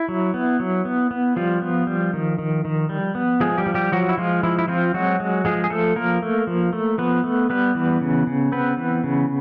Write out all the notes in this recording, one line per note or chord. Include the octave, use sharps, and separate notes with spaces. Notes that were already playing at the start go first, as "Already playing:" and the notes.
Already playing: E4
F#3
B3
F#3
B3
B3
F3 G3 F4
B3
G3
D#3
D#3
D#3
G3
B3
F3 G#3 G#4
G3 G4
F3
G3 G4
F3 F#3 F#4
E4
F3 G#3 F4
F3 E4
E4
F3 C4 F4
F#3 G#3 F#4
G#3
F3 G#3 G#4
G#4
F3 A3 A4
F3 A#3 A#4
A3
F3
A3
F3 B3 B4
A3
G3 B3 B4
E3
C#3
C#3
B3 C4 B4
E3
C#3